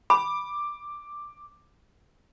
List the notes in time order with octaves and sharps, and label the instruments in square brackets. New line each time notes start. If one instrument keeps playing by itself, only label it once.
[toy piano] B5 [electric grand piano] D6